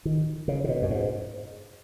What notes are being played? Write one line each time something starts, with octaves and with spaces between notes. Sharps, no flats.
D#3
C#3
C#3
B2
F#2
G#2